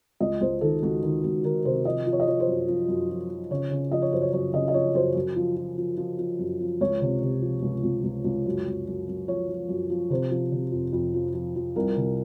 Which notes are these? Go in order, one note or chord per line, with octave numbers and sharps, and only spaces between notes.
C#2 D#5
C#2 C5
D#3 A4
C#2 F#4
D#3
C#2 F#4
D#3 A#4
C3 C5
F3 D#5
F3
C#5
D#5
F3 C#5
C5
F#2
F3
F#2
F3
F3
C#3 C#5
C#3
F3 D#5
C#5
F#2 C5
C#5
F#2 C#5
C#3 D#5
D#5
F3 C#5
F#2 C5
F#2
F3
F3
F3
F3
F3
F#2
F3
C#2 C#5
C3
C3
F3
C#2
C#2
C#2
C#2
F#2
F#2
F#2
F#2
F3 C#5
F3
F#2
F3
C3 C5
F3
C3
F2
F2
F3
F3
F3
C2 A#4
C3